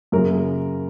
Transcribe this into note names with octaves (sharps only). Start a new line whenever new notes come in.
F#2 C#3 A#3 A#4